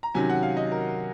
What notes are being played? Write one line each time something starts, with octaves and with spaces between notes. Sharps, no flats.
A#5
C3 D#3 F#3 C#4 G#5
F#5
F5
D#5
A#4